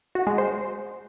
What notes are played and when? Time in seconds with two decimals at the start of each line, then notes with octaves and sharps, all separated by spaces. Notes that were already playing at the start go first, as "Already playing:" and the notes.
0.15 F#4
0.27 G#3
0.38 C5